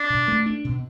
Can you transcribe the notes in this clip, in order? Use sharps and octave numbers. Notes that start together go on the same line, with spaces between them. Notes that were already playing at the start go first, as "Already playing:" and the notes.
Already playing: D4
B2
A3
D4
B2